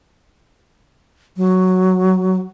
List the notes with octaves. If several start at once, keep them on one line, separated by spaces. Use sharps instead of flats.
F#3